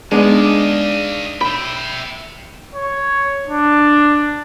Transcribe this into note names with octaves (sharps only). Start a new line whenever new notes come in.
G#3 B3 D4 D#4 D#5 F5
E5 G5 B5
C#5
D4